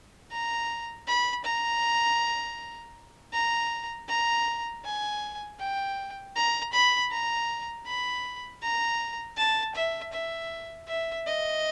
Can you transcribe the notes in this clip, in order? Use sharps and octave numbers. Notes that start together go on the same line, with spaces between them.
A#5
B5
A#5
A#5
A#5
G#5
G5
A#5
B5
A#5
B5
A#5
A5
E5
E5
E5
D#5